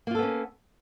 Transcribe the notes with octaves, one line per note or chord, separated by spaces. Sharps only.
A#3 B3 C#4 F4 A4